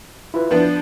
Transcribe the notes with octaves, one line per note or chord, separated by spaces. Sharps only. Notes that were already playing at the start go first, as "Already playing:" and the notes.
E4 F4 B4
F3 B3 D4